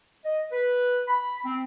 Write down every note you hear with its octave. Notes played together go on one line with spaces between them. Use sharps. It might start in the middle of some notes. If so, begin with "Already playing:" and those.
D#5
B4
B5
C4